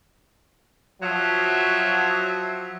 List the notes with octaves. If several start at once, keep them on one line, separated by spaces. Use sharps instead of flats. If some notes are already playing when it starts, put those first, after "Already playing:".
F3 F#3 E5